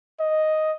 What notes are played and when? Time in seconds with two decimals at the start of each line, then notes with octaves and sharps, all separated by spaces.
0.20 D#5